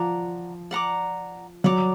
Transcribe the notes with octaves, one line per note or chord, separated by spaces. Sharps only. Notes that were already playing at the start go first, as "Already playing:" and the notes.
Already playing: F3 D5 F#5 A#5 D6
D5 F#5 A#5 D6
F#3 D5 F#5 A#5 D6